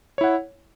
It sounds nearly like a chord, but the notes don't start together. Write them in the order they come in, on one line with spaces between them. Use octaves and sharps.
C#5 E4 F#5